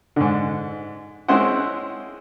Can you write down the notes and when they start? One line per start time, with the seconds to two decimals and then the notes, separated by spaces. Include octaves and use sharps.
0.16 G#2 D3
1.28 G#3 C4 C#4 E4 C5 F#5